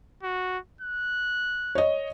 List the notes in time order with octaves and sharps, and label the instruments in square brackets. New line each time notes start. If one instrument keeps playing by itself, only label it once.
[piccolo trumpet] F#4
F#6
[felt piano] C#5 D#5